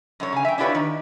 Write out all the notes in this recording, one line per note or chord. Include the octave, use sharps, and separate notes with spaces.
F#2 D3 C#5
C#3 G#5
E5 G5
D4 E4 F4 G4 B4 C#5
D#3